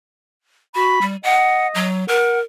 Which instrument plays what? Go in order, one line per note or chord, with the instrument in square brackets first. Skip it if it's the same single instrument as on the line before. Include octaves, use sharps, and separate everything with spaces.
[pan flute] F#4 [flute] B5
[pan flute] G3
[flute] D#5 [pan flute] F#5
[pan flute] F#3
[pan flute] A#4 [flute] F#5